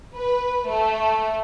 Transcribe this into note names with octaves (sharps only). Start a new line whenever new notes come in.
B4
A3